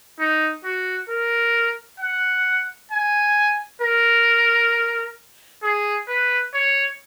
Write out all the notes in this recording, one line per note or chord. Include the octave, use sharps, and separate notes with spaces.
D#4
F#4
A#4
F#5
G#5
A#4
G#4
B4
C#5